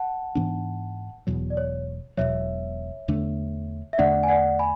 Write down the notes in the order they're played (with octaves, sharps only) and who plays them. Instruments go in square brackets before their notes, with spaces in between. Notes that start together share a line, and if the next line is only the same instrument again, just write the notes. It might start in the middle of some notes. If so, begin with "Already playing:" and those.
Already playing: [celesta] F#5 A5
[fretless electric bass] G#2 E3 B3 D4
E1 E2 B2 F#3
[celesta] D5
C#5
[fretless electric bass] E1 E2 B2 F#3 [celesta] C#5 E5
[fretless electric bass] E2 D3 A3 D4
[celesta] E5
[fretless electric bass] E2 D3 A3 D4 [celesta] D5 F#5
[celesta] G#5
D5 F#5
G#5 B5